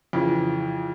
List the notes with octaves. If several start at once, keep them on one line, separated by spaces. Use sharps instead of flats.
F2 C#3 E3